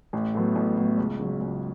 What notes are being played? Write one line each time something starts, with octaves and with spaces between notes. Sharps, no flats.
A1
A2 F#3 B3
A1
A2 F#3 B3
C#2
C#3 F#3
C#2